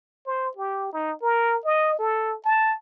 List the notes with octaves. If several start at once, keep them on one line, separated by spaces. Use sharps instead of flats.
C5
G4
D#4
A#4
D#5
A4
A5